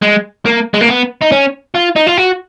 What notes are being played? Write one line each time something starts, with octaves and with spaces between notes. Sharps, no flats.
G#3
A#3
G#3
A#3
B3
D#4
C#4
F4
D#4
F4
F#4